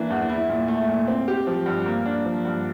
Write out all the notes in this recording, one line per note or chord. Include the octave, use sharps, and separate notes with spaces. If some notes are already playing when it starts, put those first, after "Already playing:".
Already playing: E3 A#3 D4
E2
E4
A#2
A3
A#2
C4
G4
F3
G2
A#3
D4
F3
G2